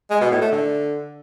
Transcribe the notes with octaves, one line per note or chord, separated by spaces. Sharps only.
G#3
B2
A2
A3
D3